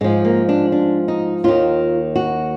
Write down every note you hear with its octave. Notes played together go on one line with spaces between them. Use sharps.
G#2 F3 G#3
A#3
D4
D4
D#4
D#2 D#3 F4
F#4